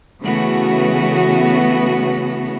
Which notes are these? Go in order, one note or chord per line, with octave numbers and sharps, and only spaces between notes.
C#3 E3 A3 B3 F#4